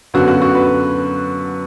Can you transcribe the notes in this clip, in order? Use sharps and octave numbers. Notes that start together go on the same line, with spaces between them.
F#2 D3 F#3 B3 F#4
F#4
F#4
B4